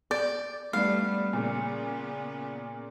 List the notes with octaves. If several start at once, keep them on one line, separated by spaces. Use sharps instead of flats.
D5 G6
G3 A3 B3 D4 F5
A#2 C#3 B3